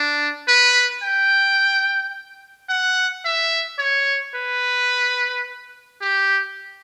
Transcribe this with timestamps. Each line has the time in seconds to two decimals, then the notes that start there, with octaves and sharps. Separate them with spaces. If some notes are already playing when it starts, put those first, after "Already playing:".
Already playing: D4
0.48 B4
1.03 G5
2.69 F#5
3.25 E5
3.79 C#5
4.35 B4
6.01 G4